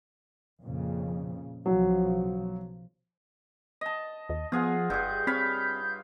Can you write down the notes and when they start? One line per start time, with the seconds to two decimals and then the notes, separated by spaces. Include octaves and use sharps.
0.62 F2 A#2 C#3
1.66 B1 C#3 F3 F#3
3.81 D#5 A5
4.29 D#2 D#5
4.52 F3 B3 F4 G#4 F#5
4.90 F#1 G2 G#4 G6
5.27 C4 C#5 F5 B5